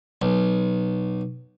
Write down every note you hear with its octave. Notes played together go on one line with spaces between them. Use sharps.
B1